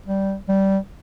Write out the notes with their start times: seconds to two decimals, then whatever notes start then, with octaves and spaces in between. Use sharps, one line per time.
0.06 G3
0.49 G3